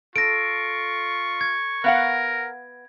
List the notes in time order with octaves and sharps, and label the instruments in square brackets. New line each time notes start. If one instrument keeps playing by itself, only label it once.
[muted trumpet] F4 [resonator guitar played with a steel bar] A4 [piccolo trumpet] C#6 [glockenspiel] A#6 D7
[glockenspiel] G#6
[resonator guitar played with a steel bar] B3 F5 F#5 [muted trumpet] A#4